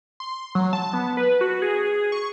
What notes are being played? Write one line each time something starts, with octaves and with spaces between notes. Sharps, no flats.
C6
F#3
A5
B3
B4
F#4
G#4
C#6